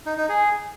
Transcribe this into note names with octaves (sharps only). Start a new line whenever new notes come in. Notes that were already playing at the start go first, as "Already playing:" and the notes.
D#4
D#4
G#4